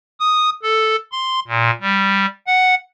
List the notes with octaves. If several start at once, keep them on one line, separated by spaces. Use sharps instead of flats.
D#6
A4
C6
A#2
G3
F#5